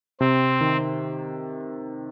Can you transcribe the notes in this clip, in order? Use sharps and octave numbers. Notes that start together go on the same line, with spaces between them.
C3 C4
D#3